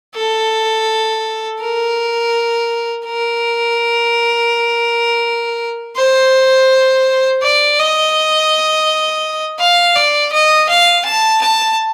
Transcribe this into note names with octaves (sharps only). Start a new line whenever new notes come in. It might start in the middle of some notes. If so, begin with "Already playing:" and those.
A4
A#4
A#4
C5
D5
D#5
F5
D5
D#5
F5
A5
A5